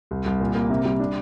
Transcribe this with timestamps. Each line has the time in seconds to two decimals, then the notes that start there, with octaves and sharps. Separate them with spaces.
0.11 C2
0.26 C2
0.40 A#2
0.55 A#3
0.70 C3
0.85 G3
1.00 D4